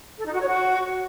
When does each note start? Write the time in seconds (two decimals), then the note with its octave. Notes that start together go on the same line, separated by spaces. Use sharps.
0.19 A4
0.26 D#4
0.33 F#4
0.40 C#5
0.47 F#4